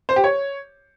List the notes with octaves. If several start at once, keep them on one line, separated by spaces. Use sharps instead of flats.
C5
G4
C#5